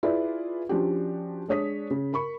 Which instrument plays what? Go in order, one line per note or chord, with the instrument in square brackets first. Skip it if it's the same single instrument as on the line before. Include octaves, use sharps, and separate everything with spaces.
[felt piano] E4 F4 G#4 B4 D5
F3 C#4 D4 F#4 G4
G#3 D4 C#5 D#6 B6
C#3
A#4 B5 C#6